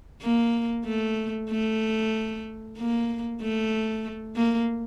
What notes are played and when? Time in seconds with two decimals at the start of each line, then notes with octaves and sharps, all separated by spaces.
0.22 A#3
0.86 A3
1.51 A3
2.78 A#3
3.42 A3
4.36 A#3